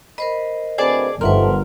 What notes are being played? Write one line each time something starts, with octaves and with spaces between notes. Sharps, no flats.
A#4 C5 D#5 B5
D2 C4 G#4 B4 D5 A5
G1 D#3 F3 A3 A#4 B4 F#5 C6